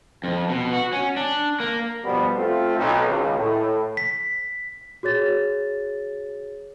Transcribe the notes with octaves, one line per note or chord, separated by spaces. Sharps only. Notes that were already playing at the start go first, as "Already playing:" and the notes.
F2
B2
F#4
C#4
D4
A#3
B2 F3 G3 B3 D4
A3 C4 F4
B1
G#1 C#2
A2
B6
F#4 G#4 C#5 A6